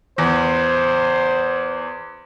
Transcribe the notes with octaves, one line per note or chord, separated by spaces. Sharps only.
E2 C5